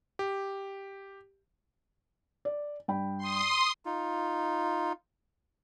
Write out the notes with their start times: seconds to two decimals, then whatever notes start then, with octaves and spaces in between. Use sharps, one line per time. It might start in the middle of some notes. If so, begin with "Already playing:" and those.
0.19 G4
2.45 D5
2.88 G2 G5 B5
3.18 C6 D#6
3.85 D#4 F4